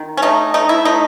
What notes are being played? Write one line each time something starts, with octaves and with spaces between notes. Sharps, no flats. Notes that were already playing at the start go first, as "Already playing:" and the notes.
Already playing: D#3
C#4
A3 D#4
A3 D#4
E4
A3 D#4